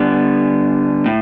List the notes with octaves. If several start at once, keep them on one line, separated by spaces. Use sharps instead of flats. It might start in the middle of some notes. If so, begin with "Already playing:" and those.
Already playing: D3 G3 B3
A2